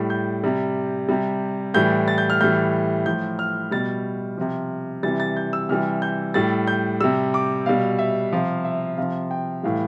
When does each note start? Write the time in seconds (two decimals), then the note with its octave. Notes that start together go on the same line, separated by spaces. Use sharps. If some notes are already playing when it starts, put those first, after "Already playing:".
Already playing: A2 G3
0.10 G6
0.44 C3 G3
1.09 C3 G3
1.74 A2 E3 G3 G6
2.08 A6
2.18 G6
2.30 F6
2.40 A2 E3 G3 G6
3.06 A2 F3 G6
3.39 F6
3.71 B2 G3 A6
4.37 C3 F3
5.03 C3 E3 G3 A6
5.20 A6
5.37 G6
5.53 E6
5.69 C3 E3 G3 F6
6.02 G6
6.34 A2 G3 A6
6.67 G6
7.00 C3 G3 E6
7.34 D6
7.66 B2 G3 F5
7.99 E5
8.32 C3 F3 F5
8.65 E5
8.97 C3 F3 F5
9.31 G5
9.63 A2 E3 G3 F5